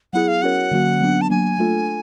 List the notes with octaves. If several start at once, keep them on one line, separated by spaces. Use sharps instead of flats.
F#3 B3 E4 G#4 F#5
F5
C#4 F#4 A#4 C#5 F#5
D3 F#3 A#3 C#4 F#4
F#3 B3 D4
A5
F#3 A#3 D4 G#5
A3 D4 F4 A4